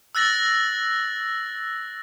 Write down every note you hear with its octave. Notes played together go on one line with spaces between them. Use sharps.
E6 F#6 A6 A#6 F#7